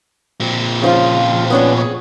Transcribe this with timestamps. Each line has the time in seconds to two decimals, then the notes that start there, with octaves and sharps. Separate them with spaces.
0.40 A#2 C4
0.82 C#3 F3 F4
1.50 B3 C#4 D4
1.77 G#4 C#5